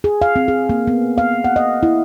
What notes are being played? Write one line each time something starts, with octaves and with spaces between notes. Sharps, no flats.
G#4
F5
C4
G#4
A#3
B3
F5
F#5
D#5
E4